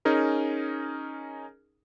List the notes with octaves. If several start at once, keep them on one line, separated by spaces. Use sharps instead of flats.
C#4 D#4 G#4 A#4